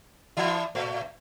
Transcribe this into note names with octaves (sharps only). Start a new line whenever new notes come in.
E3 E4
A2 A3